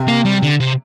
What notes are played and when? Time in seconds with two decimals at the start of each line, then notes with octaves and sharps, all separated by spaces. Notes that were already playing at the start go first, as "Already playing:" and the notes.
Already playing: C3
0.08 A#3
0.25 G3
0.43 D3
0.60 C3